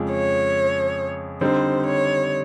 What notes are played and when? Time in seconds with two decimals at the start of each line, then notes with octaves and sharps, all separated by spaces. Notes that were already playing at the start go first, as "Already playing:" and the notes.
Already playing: F2 C#3 F3 G#3
0.10 C#5
1.41 D3 G3 C4 D#4 C5
1.85 C#5